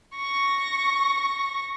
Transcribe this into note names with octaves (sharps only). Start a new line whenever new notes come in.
C#6 A#6